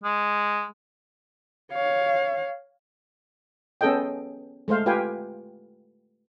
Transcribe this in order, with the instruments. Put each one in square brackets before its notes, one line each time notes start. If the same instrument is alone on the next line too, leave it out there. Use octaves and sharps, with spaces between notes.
[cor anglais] G#3
[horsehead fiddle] C#5 F5
[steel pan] B3 C#4 G#4 A4 D#5 G5
G#3 A3 C5 F5
F4 G4 B4 F5 G5 G#5